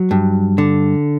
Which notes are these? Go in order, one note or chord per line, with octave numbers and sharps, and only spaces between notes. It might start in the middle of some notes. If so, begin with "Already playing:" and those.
Already playing: F#3
G2
D3